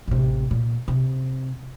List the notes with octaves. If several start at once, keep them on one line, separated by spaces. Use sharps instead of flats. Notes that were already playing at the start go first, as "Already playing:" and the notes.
A1 C3
A#2
C3